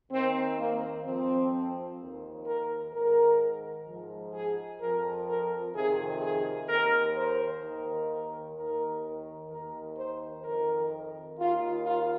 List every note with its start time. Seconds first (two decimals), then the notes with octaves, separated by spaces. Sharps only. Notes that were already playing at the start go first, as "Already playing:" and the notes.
0.11 D#2 D#3 C4
0.58 A#3
1.04 F2 F3 C4
1.99 D#2 D#3
2.46 A#4
2.93 G#2 D#3 A#4
3.87 G#2 F3
4.34 G#4
4.81 F2 F3 A#4
5.28 A#4
5.74 F2 C3 D#3 G#4
6.22 G#4
6.69 D#2 D#3 A#4
7.16 C5
7.63 D#2 D#3
8.10 A#4
8.56 D#2 D#3 A#4
9.50 D#2 D#3 A#4
9.98 C5
10.44 F2 D#3 A#4
11.38 D#2 D#3 F4
11.86 F4